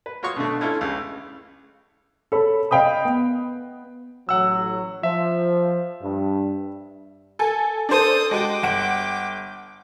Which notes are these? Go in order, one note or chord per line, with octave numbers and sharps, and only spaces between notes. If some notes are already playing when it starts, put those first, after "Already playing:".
B4
F4 F#4 C#5 C6 C#6 D#6
B2 D3 A3
C#4 E4 F4 A4
C#2 C#3
A4 C#5 B5
D#5 F5 G5 B5 D#6
B3
A1 F#3 F#5 E6
F3 E5
G2
A4 G#5
D4 A4 C5 D#6
G#3 F#4 G5 D6
G1 F#5 D7